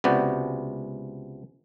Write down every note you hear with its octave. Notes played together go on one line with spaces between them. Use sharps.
C#2 C3 B3 F#4 D5 G5